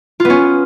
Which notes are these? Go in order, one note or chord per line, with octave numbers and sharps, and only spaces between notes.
F4
B3
C#4